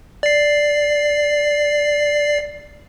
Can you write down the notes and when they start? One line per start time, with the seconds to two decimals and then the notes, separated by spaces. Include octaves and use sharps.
0.23 D5 C7